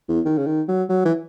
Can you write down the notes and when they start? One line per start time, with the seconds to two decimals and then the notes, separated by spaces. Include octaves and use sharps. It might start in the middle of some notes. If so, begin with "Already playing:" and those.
0.09 E2
0.25 D#3
0.38 C#3
0.47 D#3
0.68 F#3
0.89 F#3
1.05 E3